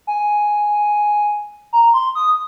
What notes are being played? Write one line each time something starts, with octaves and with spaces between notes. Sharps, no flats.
G#5
A#5
C6
D#6